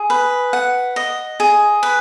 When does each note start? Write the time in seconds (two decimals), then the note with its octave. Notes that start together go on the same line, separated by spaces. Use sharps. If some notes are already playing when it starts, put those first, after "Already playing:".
Already playing: G#4
0.10 B4
0.53 F#5
0.96 D#5
1.40 G#4
1.83 B4